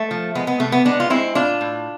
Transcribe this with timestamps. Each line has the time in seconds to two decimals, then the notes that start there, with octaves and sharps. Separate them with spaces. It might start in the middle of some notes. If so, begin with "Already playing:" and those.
Already playing: A3
0.11 F3
0.35 G#3 B3
0.47 B3
0.60 C3 A3
0.72 B3
0.85 G#3 B3 D4
1.00 F4
1.10 G#3 C4 E4
1.35 A2 D4 F4
1.61 A2